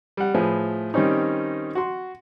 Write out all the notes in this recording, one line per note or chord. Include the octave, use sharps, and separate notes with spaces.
G3 F#5
A2 F3 G#4 B4
D#3 G3 C4 C#4 D#4
F#4 C6